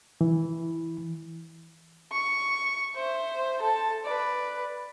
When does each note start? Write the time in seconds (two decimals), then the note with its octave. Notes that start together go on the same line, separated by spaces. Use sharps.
0.21 E3
2.12 C#6
2.96 C5 E5
3.60 A4 A5
4.04 B4 D5